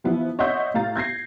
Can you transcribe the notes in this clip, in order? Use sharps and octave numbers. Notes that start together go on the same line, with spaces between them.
E3 F3 B3 E4
C#5 D#5 E5 F#5 C6 G6
A2 F5 A#5 A6
G6 G#6 A#6 C7